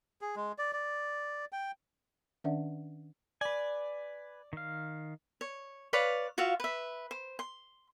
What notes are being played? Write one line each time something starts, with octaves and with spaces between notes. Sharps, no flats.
G#4
G#3
D5
D5
G5
D#3 C#4 D4 D5 E5 F#5
B4 D5 G#5
D#3 F5
C#5
B4 C#5 D5 F5
F4 F#4 E5 F5
B4 E5
C5
C6